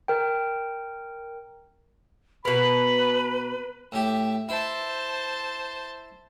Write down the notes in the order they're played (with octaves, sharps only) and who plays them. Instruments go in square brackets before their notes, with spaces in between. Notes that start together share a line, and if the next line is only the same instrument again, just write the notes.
[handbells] A#4 G5
[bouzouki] B2 A#4 [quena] B4 [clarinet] B5
[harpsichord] A2 G4 [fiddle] E5
[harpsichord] E4 [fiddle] C5 A5